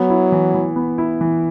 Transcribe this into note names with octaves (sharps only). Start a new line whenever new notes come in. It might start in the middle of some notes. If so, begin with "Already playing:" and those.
Already playing: F#3 B3
E4
E3
E3
B3
E4
E3